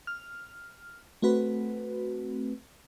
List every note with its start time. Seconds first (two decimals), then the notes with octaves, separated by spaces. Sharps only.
0.07 F6
1.22 A3 C4 F#4 B4